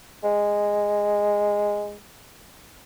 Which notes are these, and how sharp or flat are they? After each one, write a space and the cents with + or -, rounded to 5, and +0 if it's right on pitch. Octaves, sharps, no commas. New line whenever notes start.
G#3 -10